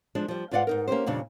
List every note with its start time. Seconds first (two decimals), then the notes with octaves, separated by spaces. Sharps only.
0.15 F3 G#3 D4
0.28 F3 G3
0.51 G#2 F4 B4 D5 F5 F#5
0.67 G#2 D#4 A#4
0.88 A#3 C#4 D#4 G4 C5
1.06 F2 A#2 C#3 G3 D4